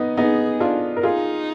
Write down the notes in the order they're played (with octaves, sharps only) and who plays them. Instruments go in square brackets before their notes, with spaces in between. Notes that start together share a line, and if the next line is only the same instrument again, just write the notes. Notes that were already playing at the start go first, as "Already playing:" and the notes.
Already playing: [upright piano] B3 D#4
[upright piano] B3 D#4 [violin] G#4
[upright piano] D4 F4
A#4
[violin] D#4 [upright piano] F4 G#4